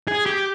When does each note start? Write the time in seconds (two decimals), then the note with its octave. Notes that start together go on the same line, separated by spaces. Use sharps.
0.08 G#4
0.26 G4